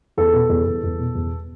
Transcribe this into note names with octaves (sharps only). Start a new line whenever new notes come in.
E2 A4
B2
E2
E2
E2
B2
E2